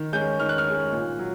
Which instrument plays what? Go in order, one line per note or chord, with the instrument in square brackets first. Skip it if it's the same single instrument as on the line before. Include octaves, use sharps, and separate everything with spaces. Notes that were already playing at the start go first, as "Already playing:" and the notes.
Already playing: [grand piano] D#3
G#3 C#4 G6
D#3 F6
F#6
F6
G#3 C#4
A#2
F#3